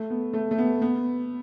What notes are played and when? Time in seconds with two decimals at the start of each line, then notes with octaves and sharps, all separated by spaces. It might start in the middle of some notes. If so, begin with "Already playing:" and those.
Already playing: A3
0.10 B3
0.33 A3
0.51 A3
0.58 B3
0.82 B3